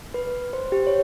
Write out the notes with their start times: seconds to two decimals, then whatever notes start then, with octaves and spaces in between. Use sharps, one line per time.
0.14 B4
0.53 C5
0.72 G4
0.87 C#5